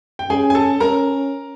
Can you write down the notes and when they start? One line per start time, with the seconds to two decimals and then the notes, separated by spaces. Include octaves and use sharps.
0.19 G5
0.30 C#4 G#4 G#5
0.50 G#5
0.55 A4 A5
0.80 C#4 A#4 A#5